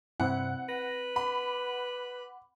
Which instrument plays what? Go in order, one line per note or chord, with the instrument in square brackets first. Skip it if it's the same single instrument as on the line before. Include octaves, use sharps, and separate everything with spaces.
[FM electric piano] G2 C3 [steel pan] C4 E4 [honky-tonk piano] F#5
[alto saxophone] B4 [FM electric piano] A#6
[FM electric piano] F#5 D6 [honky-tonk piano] B5